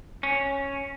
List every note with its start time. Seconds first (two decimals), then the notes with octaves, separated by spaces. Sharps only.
0.23 C#4